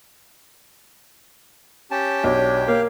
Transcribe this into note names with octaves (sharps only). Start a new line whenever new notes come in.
C#4 G4 G5 A5
B1 D4 C#5
A#3 F5